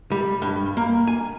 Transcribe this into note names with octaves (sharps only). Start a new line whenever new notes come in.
G3
G2
A#3
G#5